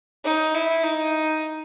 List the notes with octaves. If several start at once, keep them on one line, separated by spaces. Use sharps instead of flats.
D#4
E4
D#4